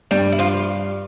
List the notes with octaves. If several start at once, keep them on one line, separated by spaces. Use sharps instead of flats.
G2 G3 G4
E4
F3 F4